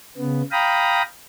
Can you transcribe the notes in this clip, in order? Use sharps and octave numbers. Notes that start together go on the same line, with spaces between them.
C#3 B3
F5 G5 A#5 B5 D#6